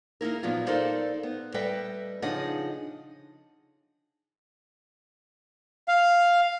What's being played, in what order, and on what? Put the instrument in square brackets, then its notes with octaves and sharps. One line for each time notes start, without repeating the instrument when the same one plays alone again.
[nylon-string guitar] A#3 D#4 E4 A#4
A#2 F3 F#3 B3 F4
D#4 A4 A#4 C5 D5 F5
B3
G3 A4 B4 D#5 E5 G5
C#3 F3 D4 D#4 D#5 F#5
[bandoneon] F5